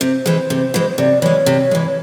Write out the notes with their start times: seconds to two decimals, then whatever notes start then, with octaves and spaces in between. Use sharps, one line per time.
0.01 C3 C5
0.26 E3 G#3
0.50 C3
0.74 E3 G#3
0.98 C3 D5
1.22 E3 G#3 C#5
1.46 C3
1.71 E3 G#3